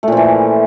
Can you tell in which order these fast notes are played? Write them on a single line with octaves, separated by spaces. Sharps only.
A3 A#2 F3 E3